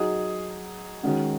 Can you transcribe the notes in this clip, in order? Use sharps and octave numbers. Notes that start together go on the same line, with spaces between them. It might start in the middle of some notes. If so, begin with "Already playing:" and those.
Already playing: F#3 D#4 G#4
D#3 G#3 C#4 F#4